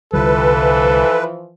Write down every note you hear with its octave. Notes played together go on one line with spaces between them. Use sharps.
C2 D3 E3 F3 G3 A4 B4